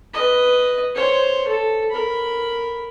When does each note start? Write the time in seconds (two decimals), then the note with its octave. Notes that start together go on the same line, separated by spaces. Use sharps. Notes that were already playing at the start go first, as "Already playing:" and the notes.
0.14 B4 D#5
0.95 C5 C#5
1.47 A4
1.91 A#4 B5